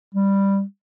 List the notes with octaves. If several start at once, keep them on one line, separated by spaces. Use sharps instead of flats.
G3